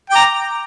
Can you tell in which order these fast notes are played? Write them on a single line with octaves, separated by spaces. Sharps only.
G5 D6 A#5